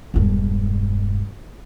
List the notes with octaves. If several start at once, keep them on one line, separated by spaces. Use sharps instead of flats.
E1 G2